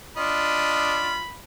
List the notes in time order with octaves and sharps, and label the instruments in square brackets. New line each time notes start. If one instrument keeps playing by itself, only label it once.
[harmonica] D4 D#5 [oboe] F4 [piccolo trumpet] B5